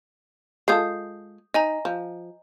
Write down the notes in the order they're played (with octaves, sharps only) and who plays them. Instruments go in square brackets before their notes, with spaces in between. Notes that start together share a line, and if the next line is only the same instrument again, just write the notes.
[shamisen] G#3 F4 A4 [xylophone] D#6 G6 C7
[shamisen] D#4 [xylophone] D#5 G#5 A#5
[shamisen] F3